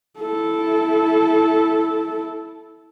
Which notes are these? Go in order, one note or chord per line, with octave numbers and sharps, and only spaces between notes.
E4 A4